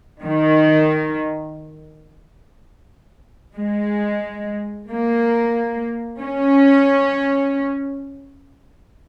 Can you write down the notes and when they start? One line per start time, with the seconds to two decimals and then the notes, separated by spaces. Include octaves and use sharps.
0.23 D#3
3.56 G#3
4.89 A#3
6.22 C#4